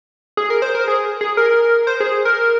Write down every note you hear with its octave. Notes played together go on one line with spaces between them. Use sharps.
G#4
A#4
C5
A#4
G#4
G#4
A#4
C5
G#4
A#4